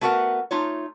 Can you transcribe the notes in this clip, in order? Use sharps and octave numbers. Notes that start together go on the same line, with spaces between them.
A3 B3 F#4 A#4 F#5
A3 D#4 F4 C#5